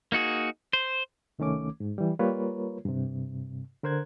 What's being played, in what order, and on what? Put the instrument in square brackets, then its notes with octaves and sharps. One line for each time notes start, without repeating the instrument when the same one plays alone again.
[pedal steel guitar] A#3 D#4 F#4 G#4
C5
[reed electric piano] C2 D#3 A3 C#4 D6
G#2
E3 G3
G3 A#3 F4 A#4 B4 C#5
G2 C3
D3 A#4 C5 F#6 G#6